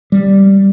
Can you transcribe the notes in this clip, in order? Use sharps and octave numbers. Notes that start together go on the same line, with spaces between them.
G3